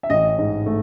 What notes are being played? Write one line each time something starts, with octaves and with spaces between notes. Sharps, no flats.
E5
A1 D#5
G#2
A3